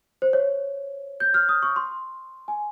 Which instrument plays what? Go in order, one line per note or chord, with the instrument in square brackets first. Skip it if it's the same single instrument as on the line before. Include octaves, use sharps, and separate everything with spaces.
[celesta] C5
C#5
G6
F6
D#6
C#6
C6
G#5